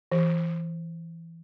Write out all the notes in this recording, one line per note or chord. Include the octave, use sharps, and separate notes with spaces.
E3